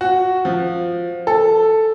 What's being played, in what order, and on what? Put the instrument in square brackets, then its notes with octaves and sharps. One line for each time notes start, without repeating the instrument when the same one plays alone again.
[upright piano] F#4
F3
A4